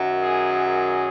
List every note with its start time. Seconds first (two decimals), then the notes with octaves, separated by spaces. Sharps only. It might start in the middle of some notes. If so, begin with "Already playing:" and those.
Already playing: F#2 D#3 F#3
0.22 G#4
0.64 G#4